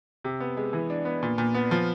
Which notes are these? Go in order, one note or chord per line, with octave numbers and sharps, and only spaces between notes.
C3
B3
G#3
E3
D4
B3
A#2
A#2
B3
F3